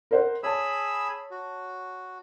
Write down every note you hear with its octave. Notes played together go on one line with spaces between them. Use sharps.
A#4 C5 F#5
G#4 C#5 A5 B5 E6
F#4